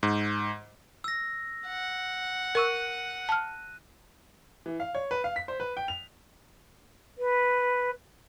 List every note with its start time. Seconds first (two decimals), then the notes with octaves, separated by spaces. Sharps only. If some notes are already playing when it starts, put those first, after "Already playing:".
0.03 G#2
1.04 E6 A#6
1.67 F#5
2.55 A#4 C#6 E6 F#6 D#7
3.29 A5 F6
4.66 E3
4.80 F5
4.95 C#5
5.11 B4
5.24 F5
5.36 B6
5.48 C5
5.60 B4
5.77 G5
5.88 F7
7.18 B4